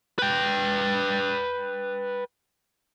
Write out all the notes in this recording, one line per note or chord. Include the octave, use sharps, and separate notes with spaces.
B4 G5